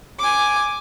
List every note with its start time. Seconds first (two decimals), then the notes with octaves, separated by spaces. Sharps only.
0.19 G#5 D6